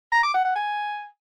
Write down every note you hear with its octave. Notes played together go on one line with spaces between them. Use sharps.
A#5
D6
F#5
F#5
G#5